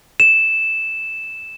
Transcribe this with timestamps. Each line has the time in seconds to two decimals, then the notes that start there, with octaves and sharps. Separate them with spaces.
0.20 E7